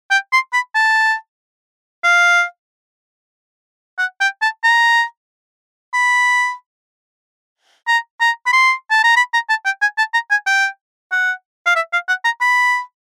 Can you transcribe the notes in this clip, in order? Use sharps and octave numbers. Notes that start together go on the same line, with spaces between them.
G5
C6
B5
A5
F5
F#5
G5
A5
A#5
B5
A#5
A#5
B5
C6
A5
A#5
B5
A#5
A5
G5
G#5
A5
A#5
G#5
G5
F#5
F5
E5
F5
F#5
A#5
B5